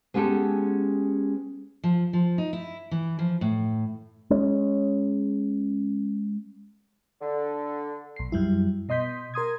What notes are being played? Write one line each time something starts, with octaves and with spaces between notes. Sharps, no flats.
G#3 B3 C#4 G4 A4
F3
F3
D#4
E4
E3
F3
A2
G#3 C#4
D3
B1 C7
F#2 G3 E4
B2 D#5 C6 G6 B6
A#4 C6 D#6 G#6